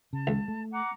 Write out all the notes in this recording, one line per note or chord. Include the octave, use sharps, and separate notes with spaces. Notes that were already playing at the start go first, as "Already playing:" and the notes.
C#3 A5
C#2
A3
F#5 A#5 D6